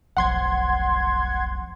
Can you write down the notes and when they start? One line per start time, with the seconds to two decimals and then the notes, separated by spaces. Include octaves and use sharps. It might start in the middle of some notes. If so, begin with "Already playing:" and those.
0.17 F1 B1 F3 F#5 C6 G#6